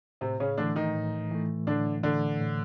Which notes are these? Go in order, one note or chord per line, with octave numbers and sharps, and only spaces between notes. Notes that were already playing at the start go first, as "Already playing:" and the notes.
A2 C3 C4
C#3 C#4
D3 E3 A3 D4
D#3 D#4
A2
E3 A3
A2 D3 D4
D3 E3 A3 D4
A2